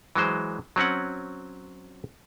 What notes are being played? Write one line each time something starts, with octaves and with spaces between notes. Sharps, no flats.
E3 F#3 G#3 C5
F#3 C4 C#4 F#5